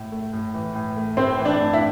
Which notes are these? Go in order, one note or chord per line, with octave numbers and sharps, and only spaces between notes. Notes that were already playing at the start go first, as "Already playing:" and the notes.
Already playing: A2
A3
A2
E3
A2
A3
A2 C4 C5
E3
D4 D5
A2
E4 E5